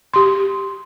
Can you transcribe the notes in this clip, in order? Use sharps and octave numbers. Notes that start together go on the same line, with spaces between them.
G4 C6